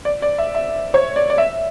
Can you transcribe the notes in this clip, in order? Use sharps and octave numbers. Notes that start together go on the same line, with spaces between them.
D5
D5
E5
E5
C#5
D5
D5
E5